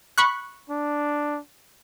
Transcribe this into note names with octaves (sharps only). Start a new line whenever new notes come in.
B5 C#6 F#6
D4